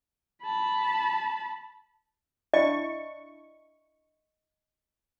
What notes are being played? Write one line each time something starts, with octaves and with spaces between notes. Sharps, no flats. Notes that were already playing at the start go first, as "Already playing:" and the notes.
A5 B5
D4 E4 D#5 C#6